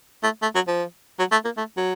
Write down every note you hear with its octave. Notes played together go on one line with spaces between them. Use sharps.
A3
A3
F#3
F3
F#3
A3
A#3
A3
F#3